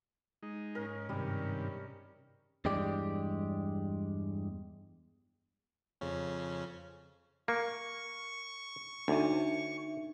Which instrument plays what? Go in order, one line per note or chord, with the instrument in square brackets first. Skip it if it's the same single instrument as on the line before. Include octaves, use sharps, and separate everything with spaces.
[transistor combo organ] G#3 D#4
[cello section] G#2 C#4 [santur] A#4
[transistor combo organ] G2 C3 D#3 [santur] G3
[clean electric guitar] E2 G2 G#3 G4 D5
[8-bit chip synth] F2 C#3 C#4
[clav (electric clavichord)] A#3 [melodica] C#6
[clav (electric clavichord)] D2 [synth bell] D4 D#4 E5